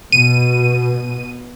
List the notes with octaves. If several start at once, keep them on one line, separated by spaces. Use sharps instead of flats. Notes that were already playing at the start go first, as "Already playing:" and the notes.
B2 D#7